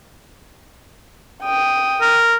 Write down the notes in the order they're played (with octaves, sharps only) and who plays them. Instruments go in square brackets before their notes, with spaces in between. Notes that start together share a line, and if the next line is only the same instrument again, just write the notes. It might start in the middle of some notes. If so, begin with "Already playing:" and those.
[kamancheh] G5 D#6
[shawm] A#4